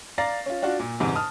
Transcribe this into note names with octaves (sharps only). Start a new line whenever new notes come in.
D5 F5 A#5 A6 A#6 C7
C#4 F4
D4 F4 F#4
A#2
G1 E2 G#2 C3
A5 D#6 F6